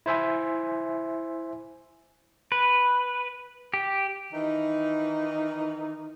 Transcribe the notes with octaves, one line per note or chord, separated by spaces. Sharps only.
E4 C5 E5 G#5
B4
G4
D#3 E3 D#4